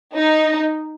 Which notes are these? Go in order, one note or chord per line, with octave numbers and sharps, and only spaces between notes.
D#4